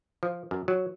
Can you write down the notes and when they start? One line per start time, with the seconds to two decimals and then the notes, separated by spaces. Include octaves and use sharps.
0.23 F3
0.51 F#2
0.68 F#3